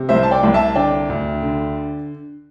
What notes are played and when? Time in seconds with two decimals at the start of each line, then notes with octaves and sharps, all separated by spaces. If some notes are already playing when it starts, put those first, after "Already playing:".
Already playing: C3
0.09 C2 C5 E5
0.23 A5
0.31 D5 G5
0.43 C2
0.54 E5 A5
0.75 D3 D5 G5
1.09 D2
1.42 D3